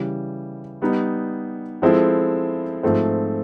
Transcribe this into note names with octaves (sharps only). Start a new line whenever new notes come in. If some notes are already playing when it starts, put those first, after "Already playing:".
Already playing: C#3 E3 G3
G3 B3 D#4
F3 G#3 C4 E4 A4
G#2 F3 A3 C4